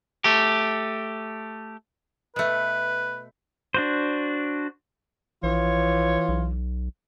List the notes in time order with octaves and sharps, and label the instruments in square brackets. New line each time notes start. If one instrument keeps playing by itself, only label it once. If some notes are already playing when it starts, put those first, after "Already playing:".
[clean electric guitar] A3 G4
[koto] B2 A3 [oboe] B4
[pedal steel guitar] D4 F#4 C5
[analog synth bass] A#1 [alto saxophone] E3 [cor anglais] F4 [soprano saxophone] C#5
[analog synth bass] B1